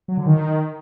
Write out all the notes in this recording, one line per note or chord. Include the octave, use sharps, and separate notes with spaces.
F#3
D3
D#3